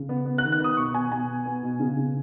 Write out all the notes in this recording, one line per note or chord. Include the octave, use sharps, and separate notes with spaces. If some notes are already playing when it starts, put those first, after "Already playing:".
Already playing: C#3
B3
B3
F#6
D#3
F#6
B3 D#6
B2 C#6
B2 G#5
B2 G#5
B2
B3
B2
C#3
C#3